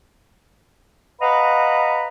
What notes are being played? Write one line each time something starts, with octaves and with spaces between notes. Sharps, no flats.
B4 D#5 F5 F#5 A#5 B5